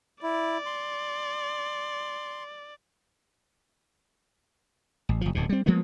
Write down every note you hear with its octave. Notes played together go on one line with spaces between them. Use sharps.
E4 D5
C6
A1
F#1 F3
D1 D2 B2
G3 C4
F3 G#3 A#3 B3